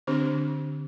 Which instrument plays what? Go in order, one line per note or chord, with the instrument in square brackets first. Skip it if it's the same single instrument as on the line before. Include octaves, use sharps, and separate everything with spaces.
[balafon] D3 C4 D4 G4